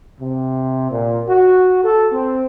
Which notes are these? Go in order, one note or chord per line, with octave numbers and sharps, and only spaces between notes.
C3
A#2
F#4
A4
C4